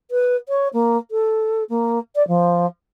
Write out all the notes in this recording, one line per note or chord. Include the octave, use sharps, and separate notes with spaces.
B4
C#5
A#3
A4
A#3
D5
F3